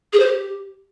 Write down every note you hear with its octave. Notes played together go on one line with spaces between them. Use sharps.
G#4
C5
G4